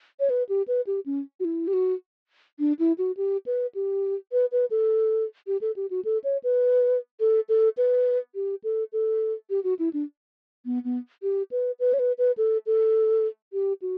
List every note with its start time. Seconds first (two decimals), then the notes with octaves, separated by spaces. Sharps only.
0.20 C#5
0.30 B4
0.49 G4
0.68 B4
0.87 G4
1.06 C#4
1.40 F#4
1.45 E4
1.67 G4
1.73 F#4
2.59 D4
2.79 E4
2.98 F#4
3.17 G4
3.46 B4
3.75 G4
4.32 B4
4.52 B4
4.71 A4
5.47 G4
5.61 A4
5.76 G4
5.90 F#4
6.05 A4
6.24 C#5
6.43 B4
7.20 A4
7.49 A4
7.77 B4
8.35 G4
8.64 A4
8.92 A4
9.50 G4
9.64 F#4
9.79 E4
9.93 D4
10.65 B3
10.84 B3
11.23 G4
11.51 B4
11.79 B4
11.93 C#5
11.99 B4
12.18 B4
12.37 A4
12.66 A4
13.53 G4
13.82 F#4